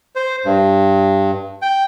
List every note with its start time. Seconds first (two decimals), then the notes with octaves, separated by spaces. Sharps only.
0.15 C5
0.45 G2
1.62 G5